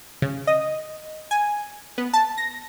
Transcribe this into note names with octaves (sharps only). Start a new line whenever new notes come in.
C#3
D#5
G#5
B3
A5
A#6